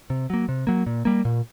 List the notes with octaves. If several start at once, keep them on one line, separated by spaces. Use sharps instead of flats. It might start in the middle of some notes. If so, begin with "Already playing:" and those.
C3
F#3 A#3
C3
F#3 A#3
A#2
G3 A#3
A#2